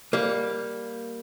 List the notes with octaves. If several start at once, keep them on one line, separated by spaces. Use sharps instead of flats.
G3 A#3